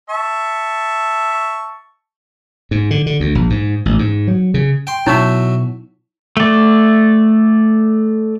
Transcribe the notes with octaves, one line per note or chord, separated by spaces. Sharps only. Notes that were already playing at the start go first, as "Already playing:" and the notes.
E5 A5 C#6
G#2
D3
D3
D2
A#1
G#2
A1
G#2
F#3
C#3
G5 C6
B2 F#3 D#4 E4 F#4 C#5 E5
A3 D5